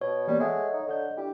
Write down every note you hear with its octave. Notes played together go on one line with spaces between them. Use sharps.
B2 C#5
E3 G3 A#3 B3
G#3 A4 E5 F#5
D#4
D3 D#5 F#5 G6
D4 E4 G4